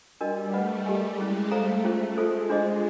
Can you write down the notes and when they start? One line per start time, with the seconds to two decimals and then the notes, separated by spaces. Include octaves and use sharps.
0.20 G3 D4 F#4 A#4 D#5 G5
0.53 A3 B4 D#5 F#5 B5
0.86 G3 G4 A#4 D#5 G#5
1.18 G#3 C#4 E4 G#4
1.51 A3 A4 C5 F5 A#5
1.84 A3 C#4 F4 G#4 C5
2.16 G#3 F4 A4 C5
2.50 D4 F4 G#4 C5 D#5